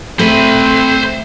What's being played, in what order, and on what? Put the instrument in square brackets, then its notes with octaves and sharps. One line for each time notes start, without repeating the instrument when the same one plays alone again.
[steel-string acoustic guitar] A3 [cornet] C4 [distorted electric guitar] C5 B5